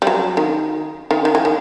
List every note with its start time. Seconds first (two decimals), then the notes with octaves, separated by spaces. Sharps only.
0.02 G3
0.07 F#3
0.37 D#3
1.11 D#3
1.25 D#3
1.35 E3
1.45 D#3